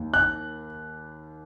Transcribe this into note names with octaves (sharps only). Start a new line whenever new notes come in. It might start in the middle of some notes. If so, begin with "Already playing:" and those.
Already playing: D#2
F#6